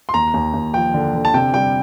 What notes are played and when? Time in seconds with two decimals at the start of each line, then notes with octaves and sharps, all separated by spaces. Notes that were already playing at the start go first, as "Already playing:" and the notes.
0.09 C6
0.14 D#2 A#5
0.34 D#2
0.54 D#2
0.74 F3 G5
0.94 D3
1.14 D3
1.25 A5
1.34 C3 G5
1.54 G3 G5